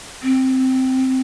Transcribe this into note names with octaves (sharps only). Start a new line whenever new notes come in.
C4